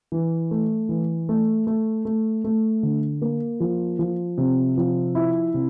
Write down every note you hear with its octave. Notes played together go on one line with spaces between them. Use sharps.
E3
A3
E3
A3
A3
A3
A3
D3
A#3
F3
F3
C3
F3
E4
C3